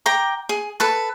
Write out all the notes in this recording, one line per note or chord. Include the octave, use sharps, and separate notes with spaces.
G5 A#5 D6
G#4
A4 B4 A5